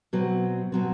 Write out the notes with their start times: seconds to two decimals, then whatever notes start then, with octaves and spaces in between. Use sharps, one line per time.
0.13 B2 F#3 C4
0.72 B2 F#3 C4